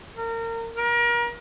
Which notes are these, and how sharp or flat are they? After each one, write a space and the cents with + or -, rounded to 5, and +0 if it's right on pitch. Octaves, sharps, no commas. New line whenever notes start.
A#4 -30
A#4 +35